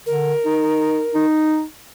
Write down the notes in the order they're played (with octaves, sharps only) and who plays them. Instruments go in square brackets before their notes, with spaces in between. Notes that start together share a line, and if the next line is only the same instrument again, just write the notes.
[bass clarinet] D3 [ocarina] A#4
[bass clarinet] D#4
D#4